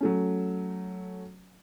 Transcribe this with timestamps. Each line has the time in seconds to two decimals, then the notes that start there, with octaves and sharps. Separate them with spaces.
0.01 F#3 A3 C#4